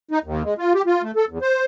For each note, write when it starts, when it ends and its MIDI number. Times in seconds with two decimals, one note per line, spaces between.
0.11 0.19 63
0.24 0.43 39
0.44 0.54 56
0.58 0.73 65
0.74 0.82 67
0.86 1.02 65
1.03 1.11 57
1.16 1.25 69
1.29 1.38 40
1.41 1.65 72